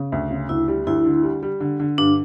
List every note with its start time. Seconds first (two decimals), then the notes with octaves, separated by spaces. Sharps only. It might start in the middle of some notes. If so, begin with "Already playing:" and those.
Already playing: C#3
0.12 D2
0.31 C#3
0.49 D2 E4
0.68 G3
0.87 D2 E4
1.05 D3
1.23 G3
1.43 G3
1.61 D3
1.80 D3
1.98 G2 D4